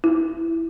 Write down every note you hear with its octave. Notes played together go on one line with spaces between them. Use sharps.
E4